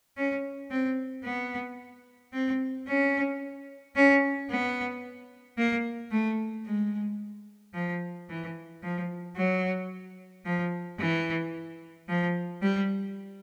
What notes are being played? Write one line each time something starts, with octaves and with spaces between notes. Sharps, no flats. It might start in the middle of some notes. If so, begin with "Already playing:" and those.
C#4
C4
B3
C4
C#4
C#4
B3
A#3
A3
G#3
F3
E3
F3
F#3
F3
E3
F3
G3